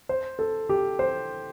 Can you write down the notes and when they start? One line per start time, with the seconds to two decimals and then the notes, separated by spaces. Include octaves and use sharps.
0.09 C5
0.39 A4
0.69 G4
0.99 C5